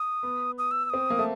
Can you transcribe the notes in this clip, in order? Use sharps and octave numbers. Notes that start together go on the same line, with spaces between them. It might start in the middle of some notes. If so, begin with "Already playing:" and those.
Already playing: D#6
B3
D#6
E6
E6
C4 D#6
A#3
A3